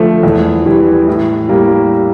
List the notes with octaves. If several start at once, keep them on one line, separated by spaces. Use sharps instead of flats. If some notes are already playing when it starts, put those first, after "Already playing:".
Already playing: D3 F3 A3
E2
E3 G3
A2
G3 A#3